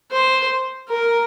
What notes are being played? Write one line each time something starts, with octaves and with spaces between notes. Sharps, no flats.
C5
A#4